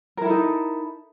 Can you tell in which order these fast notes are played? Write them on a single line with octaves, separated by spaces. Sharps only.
A#4 E4 A4 D#4